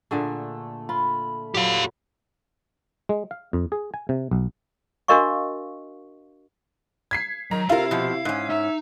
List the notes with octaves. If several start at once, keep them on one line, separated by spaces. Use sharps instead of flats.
A#2 D3 A3 G#4
F4 B5
A#2 F#3 G4 F5
G#3
F5
F2
G#4
G#5
C3
B1
D4 F#4 A#4 D#5 F5 C#6
G#6 B6 C7
D#3 F#3 A#5
C3 E4 F4 A#4 F5
B2 F3
G#2 C#4
D#4 E5